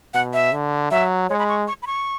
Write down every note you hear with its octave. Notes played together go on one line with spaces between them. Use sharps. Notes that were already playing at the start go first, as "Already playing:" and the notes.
B2 F#5
E5
D3
F#3 E5
G#3 C#5
B5
C#6
C#6
B5
C#6